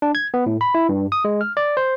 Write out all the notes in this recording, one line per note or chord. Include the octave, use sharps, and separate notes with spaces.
D4
G#6
B3
A2
B5
E4
G2
D#6
G#3
F6
D5
C5